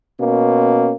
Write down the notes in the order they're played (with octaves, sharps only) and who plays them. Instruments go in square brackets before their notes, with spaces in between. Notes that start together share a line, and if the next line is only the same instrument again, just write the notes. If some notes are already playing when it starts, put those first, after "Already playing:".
[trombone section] B2 A#3 C#4